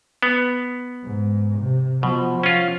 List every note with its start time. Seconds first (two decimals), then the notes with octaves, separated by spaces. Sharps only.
0.23 B3
1.04 G#2
1.59 C3
2.03 B2 F3
2.43 C#4 F4